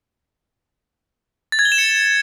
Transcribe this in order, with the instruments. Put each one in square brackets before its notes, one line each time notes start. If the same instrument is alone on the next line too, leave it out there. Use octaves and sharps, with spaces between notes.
[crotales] A6
G#6
G7
E7
C#7